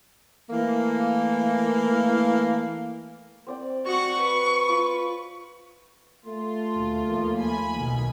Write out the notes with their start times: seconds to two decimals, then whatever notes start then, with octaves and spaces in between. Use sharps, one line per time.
0.50 E3 A3 A#3
3.47 C4 D5 G5
3.85 F#4 F#5 C#6
4.17 B4
4.69 F4
6.26 A3 F4
6.75 D2 A#2
7.04 D#2 F3 A#3
7.38 G#5 B5
7.74 B1 D#3